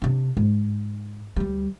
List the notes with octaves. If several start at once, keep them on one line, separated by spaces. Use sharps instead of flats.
C3 D4
G#2
D2 G3